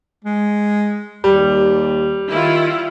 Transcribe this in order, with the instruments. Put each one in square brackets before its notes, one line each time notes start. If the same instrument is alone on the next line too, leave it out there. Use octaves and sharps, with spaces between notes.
[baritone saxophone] G#3
[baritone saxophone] D#2 [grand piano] G3
[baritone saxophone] D#3 [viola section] E4 F4